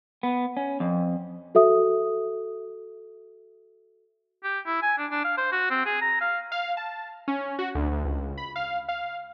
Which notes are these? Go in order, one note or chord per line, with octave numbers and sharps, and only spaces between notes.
B3
C#4
F2
F#4 A4 E5 D#6
G4
E4
G#5
D4
D4
F5
C5
F#4
C4
G#4
A#5
F5
F5
A5
C#4
F#4
D2
D2
C#2
B5
F5
F5